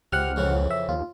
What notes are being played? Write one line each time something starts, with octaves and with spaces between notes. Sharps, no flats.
C#2 C3 F#5 F6
F2 C#3 E3
E5
D#2 F4